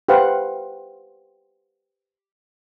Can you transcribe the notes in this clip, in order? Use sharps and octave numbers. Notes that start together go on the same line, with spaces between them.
G4 B4 C5 F5 F#5